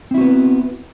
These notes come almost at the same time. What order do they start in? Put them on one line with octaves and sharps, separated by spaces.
C4 E4 F#4 B3